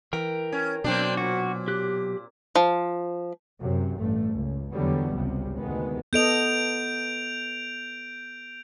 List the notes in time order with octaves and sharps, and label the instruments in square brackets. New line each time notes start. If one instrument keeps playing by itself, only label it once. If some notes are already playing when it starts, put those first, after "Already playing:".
[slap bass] E3 [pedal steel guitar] A#4 G5
[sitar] C#4
[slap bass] B2 F#3 [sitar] A#3 C4 D4
[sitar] A#2 [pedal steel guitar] F#4
[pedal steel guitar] G4 F#6
[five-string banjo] F3
[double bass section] F#2 C3
A1 G2 A3
C#2
E2 D3 F#3 G3 B3
G#1 C#2 C3 G3
D2 C3 D#3 G#3 B3
[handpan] B3 A4 D#5 [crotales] G6 D7 F7